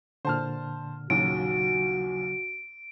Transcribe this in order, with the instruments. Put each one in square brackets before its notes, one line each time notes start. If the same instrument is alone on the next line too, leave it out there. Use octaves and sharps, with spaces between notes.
[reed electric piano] A#2 D3 [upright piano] C5 A5 F6
[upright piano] A#1 D#2 [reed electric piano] C#3 F#3 [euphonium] F#4 [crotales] D7